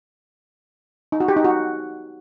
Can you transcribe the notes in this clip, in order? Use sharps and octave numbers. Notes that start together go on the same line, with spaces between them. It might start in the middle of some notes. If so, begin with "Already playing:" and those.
D#4
F#4
G4
D#4
F#4